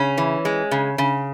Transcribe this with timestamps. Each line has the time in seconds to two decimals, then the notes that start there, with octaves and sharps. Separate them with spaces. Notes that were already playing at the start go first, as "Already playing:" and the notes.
Already playing: C#3 C#4
0.18 E3
0.45 G#3
0.71 C#3
0.98 C#3